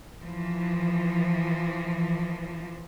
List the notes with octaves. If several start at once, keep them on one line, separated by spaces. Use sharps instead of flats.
E3 F3